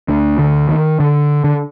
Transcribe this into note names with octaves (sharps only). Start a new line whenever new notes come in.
D2 D3
D3
D#3
D3
D3